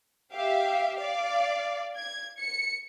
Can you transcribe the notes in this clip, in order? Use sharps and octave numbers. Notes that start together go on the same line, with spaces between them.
G4 E5 F5
D5 F5
G#6
C#7